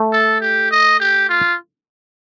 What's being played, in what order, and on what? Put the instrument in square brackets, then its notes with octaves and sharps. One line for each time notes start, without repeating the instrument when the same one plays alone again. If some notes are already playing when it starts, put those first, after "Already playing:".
Already playing: [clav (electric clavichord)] A3
[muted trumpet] A4
G4
D#5
G4
F4